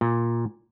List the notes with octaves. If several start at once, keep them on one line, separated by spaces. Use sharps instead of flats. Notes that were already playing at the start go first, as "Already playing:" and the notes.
A#2